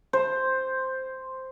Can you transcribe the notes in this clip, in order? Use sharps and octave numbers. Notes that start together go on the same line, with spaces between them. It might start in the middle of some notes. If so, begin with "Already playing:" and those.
C5